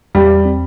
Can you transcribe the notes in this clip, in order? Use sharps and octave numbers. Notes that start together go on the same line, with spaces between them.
E2 G3
C4